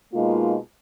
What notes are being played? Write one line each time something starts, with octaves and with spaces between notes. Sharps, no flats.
B2 G#3 A#3 D#4 F4